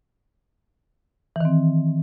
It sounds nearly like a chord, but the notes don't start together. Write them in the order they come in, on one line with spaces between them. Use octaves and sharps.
E3 D#3 C4